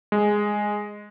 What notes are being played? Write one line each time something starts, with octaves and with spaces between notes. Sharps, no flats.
G#3